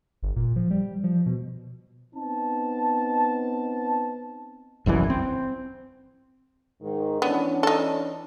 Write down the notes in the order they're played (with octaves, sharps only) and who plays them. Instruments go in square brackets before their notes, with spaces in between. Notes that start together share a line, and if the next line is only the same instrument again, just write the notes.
[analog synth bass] G1
A#2
F3
G3
F3
B2
[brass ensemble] B3 C4 D#4 A5
[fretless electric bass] G1 C2 F#2 E3
C4
[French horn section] G#2 D#3
[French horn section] E3 C#4 D4 [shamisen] B3
[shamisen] D#4 A4